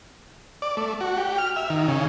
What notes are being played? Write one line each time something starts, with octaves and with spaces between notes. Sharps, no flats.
D5
A3
F#4
G4
F6
E5
D#3
C#3